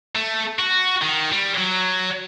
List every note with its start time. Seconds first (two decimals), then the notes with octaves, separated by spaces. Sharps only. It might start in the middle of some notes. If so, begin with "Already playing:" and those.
0.15 A3
0.59 F#4
1.01 D#3
1.32 G3
1.58 F#3